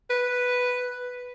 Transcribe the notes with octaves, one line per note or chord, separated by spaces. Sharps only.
B4